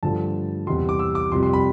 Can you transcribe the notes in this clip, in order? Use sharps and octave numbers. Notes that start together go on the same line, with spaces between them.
G2 D3 F3 A3 A5
E2 C3 G3 C6
D6
E6
D6
F2 C3 G3 C6
C6
B5